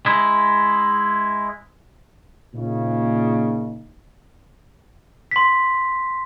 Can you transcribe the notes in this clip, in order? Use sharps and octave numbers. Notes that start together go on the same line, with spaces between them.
G#3 E4
A#2 C#3 D#4
C6 B6